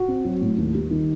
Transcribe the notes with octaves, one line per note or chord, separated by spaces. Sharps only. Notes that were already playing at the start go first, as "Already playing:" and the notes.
Already playing: F#4
C4
F#3
A2
D#2
G3
D#3